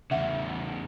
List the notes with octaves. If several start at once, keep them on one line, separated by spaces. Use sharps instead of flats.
E2 C#3 E5 F#5